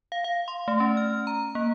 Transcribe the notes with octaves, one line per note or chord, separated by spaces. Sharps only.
F5
F5
C6
A3
C#4
F6
A#5
A#3